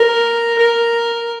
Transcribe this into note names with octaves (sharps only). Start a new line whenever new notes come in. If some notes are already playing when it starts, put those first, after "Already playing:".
Already playing: A#4
A#4